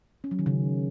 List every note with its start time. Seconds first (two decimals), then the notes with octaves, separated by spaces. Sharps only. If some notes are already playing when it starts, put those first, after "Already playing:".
0.24 C#4
0.31 F#3
0.39 D#3
0.46 C#3